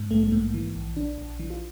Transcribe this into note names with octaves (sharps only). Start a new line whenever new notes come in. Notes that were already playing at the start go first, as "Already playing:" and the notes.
Already playing: G#2
A#1 A3
A3
G#2 A#3
E3
A#1
A#1 D4
A#1
E3
F4